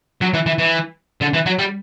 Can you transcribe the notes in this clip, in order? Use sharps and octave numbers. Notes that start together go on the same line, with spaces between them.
F#3
E3
E3
E3
D3
E3
F#3
G3